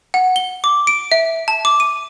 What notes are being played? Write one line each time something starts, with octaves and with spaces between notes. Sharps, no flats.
F#5
G7
D6
D7
E5
A5
D6
D#7